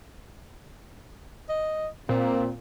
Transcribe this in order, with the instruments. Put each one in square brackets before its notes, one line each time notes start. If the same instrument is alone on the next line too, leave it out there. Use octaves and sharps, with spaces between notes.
[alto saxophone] D#5
[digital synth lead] A#2 [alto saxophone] C4